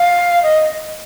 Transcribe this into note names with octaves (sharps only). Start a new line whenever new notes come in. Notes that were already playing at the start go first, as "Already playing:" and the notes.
Already playing: F5
D#5